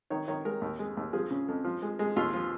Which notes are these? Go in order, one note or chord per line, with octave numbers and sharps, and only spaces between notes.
D#3 C#5
D#3 C#5
G#3 A#4
D#2
G#3
D#2
F3 G#4
C#3
F2
F3
G#3
G#3
D#2 F4
F3